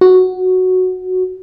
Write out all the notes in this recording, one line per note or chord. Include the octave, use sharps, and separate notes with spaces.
F#4